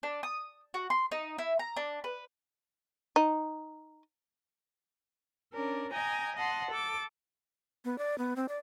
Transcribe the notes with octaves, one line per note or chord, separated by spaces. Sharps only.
D4
D#6
F#4
C6
D#4
E4
A#5
D4
B4
D#4
C#4 D4 A#4
D#5 G5 G#5 A#5
D#5 F#5 A5 C6
A4 D6
B3
D5
B3
C4
D5